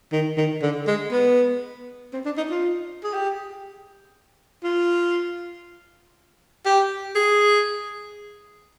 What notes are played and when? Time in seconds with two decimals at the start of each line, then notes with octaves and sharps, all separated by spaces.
0.12 D#3
0.37 D#3
0.62 D3
0.87 G#3
1.12 B3
2.13 C4
2.26 D4
2.37 D#4
2.51 F4
3.04 G#4
3.14 G4
4.64 F4
6.65 G4
7.15 G#4